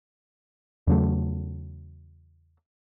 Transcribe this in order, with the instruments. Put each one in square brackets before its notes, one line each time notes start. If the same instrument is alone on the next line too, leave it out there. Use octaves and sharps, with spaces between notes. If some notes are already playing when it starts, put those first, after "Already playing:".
[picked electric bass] E2 C#3 F#3 A3